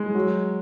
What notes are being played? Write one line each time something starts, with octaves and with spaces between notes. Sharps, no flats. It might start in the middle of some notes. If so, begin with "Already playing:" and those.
Already playing: G#3
F#3